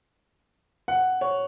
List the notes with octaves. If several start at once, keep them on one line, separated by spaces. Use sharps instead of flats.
F#5
C#5